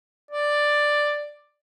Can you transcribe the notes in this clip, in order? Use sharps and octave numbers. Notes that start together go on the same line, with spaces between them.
D5